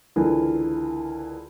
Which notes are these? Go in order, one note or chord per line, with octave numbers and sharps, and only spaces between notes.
C#2 D3 E3 A#4